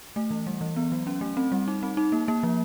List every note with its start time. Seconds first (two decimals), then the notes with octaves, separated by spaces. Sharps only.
0.16 A3
0.30 E3
0.47 G3
0.61 E3
0.76 B3
0.92 F#3
1.07 C#4
1.21 A3
1.37 C4
1.52 G3
1.68 D#4
1.83 C4
1.97 D#4
2.12 A#3
2.28 A#3
2.43 F3